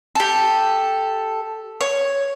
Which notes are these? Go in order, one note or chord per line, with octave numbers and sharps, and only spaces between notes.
G4 A4
C#5